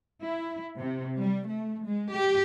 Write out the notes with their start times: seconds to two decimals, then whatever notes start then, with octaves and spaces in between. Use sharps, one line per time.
0.20 E4
0.76 C3
1.17 G3
1.47 A3
1.83 G#3
2.14 G4